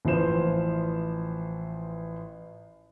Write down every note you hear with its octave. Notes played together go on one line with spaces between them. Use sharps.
A1 E3 F3 E4 C5 E7